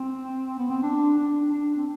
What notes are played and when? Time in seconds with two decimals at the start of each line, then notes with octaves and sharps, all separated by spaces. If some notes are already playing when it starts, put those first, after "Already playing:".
Already playing: C4
0.58 B3
0.70 C4
0.83 D4
1.18 D4
1.52 D4
1.77 C4